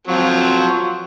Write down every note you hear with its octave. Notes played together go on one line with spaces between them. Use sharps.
F3 F#3 C4